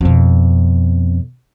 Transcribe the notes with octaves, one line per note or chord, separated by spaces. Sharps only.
F2 B2